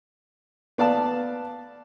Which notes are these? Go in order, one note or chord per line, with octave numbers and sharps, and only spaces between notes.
B3 D5 F5 A5